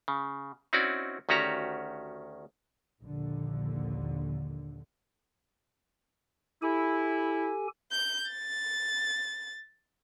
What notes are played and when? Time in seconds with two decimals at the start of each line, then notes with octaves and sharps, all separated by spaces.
0.08 C#3
0.73 C4 C#4 D#4 E4 F#4 D5
1.29 D2 D#3 C#4 F#4 G4 A#5
3.01 A#1 D#2 D3
6.62 E4 G4 A4 G#5
7.91 G6
8.32 A6